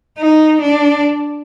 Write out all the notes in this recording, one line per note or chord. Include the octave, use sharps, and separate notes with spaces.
D#4
D4